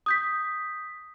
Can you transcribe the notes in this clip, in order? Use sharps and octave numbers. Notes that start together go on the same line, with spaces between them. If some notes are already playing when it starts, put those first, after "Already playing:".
D#6 G6 B6